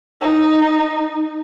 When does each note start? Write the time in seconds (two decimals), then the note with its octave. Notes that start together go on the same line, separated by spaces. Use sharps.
0.21 D#4